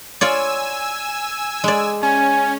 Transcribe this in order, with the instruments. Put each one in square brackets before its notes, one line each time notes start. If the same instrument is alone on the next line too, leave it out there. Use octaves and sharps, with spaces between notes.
[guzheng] F4 C#5 D5 [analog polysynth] G#5 E6
[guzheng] G#3 D5
[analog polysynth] C#4 [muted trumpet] G#5